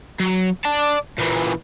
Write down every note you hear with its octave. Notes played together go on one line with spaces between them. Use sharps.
F#3
D5 A5
A#2 E3